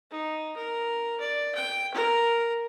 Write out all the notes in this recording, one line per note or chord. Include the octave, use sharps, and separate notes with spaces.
D#4
A#4
D5
G5
A#4